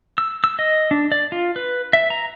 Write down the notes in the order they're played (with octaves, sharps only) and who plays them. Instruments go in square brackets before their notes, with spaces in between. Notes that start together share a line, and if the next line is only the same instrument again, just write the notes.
[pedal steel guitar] E6
E6
D#5
D4
D5
F4
B4
E5
A#5